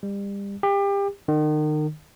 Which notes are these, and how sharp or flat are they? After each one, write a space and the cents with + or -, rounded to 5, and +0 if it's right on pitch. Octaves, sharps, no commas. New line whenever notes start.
G3 +35
G4 +30
D#3 -35